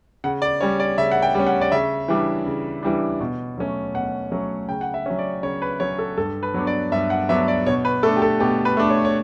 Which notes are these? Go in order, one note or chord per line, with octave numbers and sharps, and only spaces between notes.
C#3 F#5
D5
G3 C#4 C#5
D5
C#3 E5
F#5
G5
G3 C#4
F#5
D5
C#3 E5
E3 G3 D4
C#3
E3 G3 D4
B2
F#3 A3 C#4
B2 F#5
F#3 A3 C#4
C#3 G5
F#5
E5
F#3 C#4
D5
C#3 C#5
B4
F#3 C#4 C#5
A4
G2 A4
B4
F#3 B3 D4
D5
G2 E5
F#5
F#3 B3 D4 E5
D5
B2 C#5
B4
A3 D4 A4
G4
A4
B2 G4
B4
A3 D4
C#5
C#5